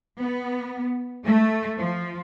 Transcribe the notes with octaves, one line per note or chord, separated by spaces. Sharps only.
B3
A3
F3